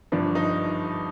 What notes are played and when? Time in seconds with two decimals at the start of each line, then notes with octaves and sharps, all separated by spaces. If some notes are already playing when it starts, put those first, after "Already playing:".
0.12 G1 G2 F3 D4
0.35 D#4